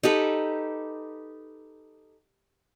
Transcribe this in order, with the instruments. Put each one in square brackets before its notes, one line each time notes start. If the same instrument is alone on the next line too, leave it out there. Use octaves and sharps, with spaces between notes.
[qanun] D#4 G4 A4 B4